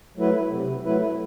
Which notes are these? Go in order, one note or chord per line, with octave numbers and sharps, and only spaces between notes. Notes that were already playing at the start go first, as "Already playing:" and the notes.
F#3 A3 E4 B4
C3
F#3 A3 E4 B4